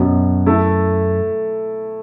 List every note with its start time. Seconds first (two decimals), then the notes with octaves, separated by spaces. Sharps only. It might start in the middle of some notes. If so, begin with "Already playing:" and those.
Already playing: F#2 B2 F#3 B3
0.46 A3 E4 A4